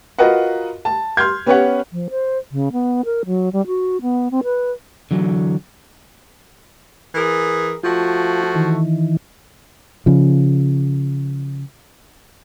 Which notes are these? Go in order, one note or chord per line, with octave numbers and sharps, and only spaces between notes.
F4 F#4 A#4 B4 D#5 F#5
A5
C6 F6 G6 G#6
B3 C#4 G4 B4 C#5 F#5
F3
C5
C#3
B3
A#4
F#3
G3
F#4
B3
C4
B4
D3 E3 F#3
E3 G#4 A#4
F3 A3 F4 F#4
D#3 E3
C#3 F3